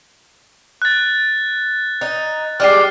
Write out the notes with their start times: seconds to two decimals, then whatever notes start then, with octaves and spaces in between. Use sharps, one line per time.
0.82 F#6 A6
2.01 D#4
2.60 G3 G#3 G4 F6 C7